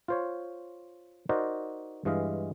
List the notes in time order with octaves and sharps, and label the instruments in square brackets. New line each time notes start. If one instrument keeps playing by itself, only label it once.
[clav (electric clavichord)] F4 C5 C#5
D#4 F#4 A#4 C5 D5 D#5
G2 E3 G#3 D#5 F5